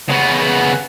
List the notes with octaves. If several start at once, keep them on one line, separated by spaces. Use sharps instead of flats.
C#3 B3